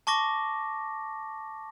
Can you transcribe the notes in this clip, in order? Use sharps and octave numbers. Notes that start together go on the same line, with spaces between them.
A5 C#6 D6 A#6